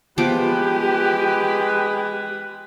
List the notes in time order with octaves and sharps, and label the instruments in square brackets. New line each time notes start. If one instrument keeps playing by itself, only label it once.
[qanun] F3 B3 D6 [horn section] G#3 B4 [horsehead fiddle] G4